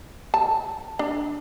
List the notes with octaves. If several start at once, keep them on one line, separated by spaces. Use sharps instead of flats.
A5
D4